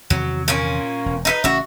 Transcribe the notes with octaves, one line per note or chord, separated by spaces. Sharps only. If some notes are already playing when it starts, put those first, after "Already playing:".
E2 C3 D#3 F#3
A#2 A#3 C#4
E1
D#4 E4 B4
A1 C#3 C#4 F#4 E5